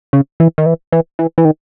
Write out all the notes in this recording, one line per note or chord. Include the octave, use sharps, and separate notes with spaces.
C#3
E3
D#3
E3
E3
E3
E3
D#3